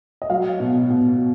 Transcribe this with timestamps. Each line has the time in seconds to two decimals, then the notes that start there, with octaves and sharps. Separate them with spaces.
0.22 D#5
0.30 F#3 F5
0.60 B2
0.90 B2